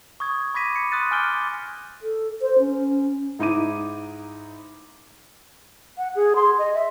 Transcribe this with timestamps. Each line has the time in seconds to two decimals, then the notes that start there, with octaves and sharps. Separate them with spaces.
0.20 C#6 D#6 G#6
0.54 B5 D6 G#6 A#6 B6 D#7
0.76 C#7
0.91 C6 D#6 F#6 A6 D#7
1.11 G#5 D6 F6 G6 D7 G7
2.02 A4
2.41 C5
2.59 C#4
3.39 G#2 D#4 E4 D6 D#7
5.98 F#5
6.16 G#4
6.36 C6
6.59 D#5
6.74 E5